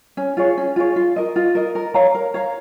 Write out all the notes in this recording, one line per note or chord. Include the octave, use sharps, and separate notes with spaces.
C#4
F4 G#4 C#5
C#4
F4 G#4 C#5
F4
A#4 D#5
F4
A#4 D#5
A#4
C#5 F5 A#5
A#4
C#5 F5 A#5